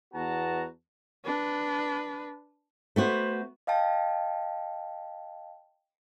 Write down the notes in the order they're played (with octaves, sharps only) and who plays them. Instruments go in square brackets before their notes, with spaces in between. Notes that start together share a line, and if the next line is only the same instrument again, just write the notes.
[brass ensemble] E2 B3 F#4 A5 A#5
[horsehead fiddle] D4 B4
[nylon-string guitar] A3 B3 F#4 [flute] C5
[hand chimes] D#5 F5 G5 A5